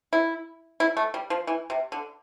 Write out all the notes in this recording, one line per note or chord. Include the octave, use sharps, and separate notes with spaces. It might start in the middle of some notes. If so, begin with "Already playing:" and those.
E4
E4
A3
G3
F3
E3
C3
D3